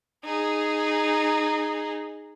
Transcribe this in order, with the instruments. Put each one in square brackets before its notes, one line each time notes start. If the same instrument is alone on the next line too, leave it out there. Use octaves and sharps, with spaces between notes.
[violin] D#4 G#4